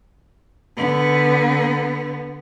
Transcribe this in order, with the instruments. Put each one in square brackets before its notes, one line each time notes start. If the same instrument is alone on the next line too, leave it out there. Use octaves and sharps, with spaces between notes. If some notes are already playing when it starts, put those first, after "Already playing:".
[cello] D3 B3